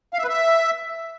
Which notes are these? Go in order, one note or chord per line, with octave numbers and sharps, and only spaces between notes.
F5
E5
B4
E5